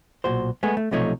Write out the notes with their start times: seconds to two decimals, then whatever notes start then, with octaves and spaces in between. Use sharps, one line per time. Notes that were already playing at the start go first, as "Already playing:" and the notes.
0.24 B1 A#2 F#4 C5
0.63 G#3 A3 B3 G#4
0.77 A3
0.91 B1 C3 F3 A3 D#4 C#5